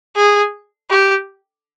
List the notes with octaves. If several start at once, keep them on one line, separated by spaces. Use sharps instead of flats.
G#4
G4